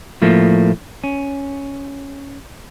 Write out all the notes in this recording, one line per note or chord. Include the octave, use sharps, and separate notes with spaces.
A2 F3 A3 A#3
C#4